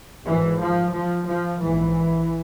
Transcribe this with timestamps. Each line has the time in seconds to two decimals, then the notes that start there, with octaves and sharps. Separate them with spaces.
0.24 G#1 G#2 E3
0.59 F3
0.93 F3
1.26 F3
1.60 A#1 G#2 E3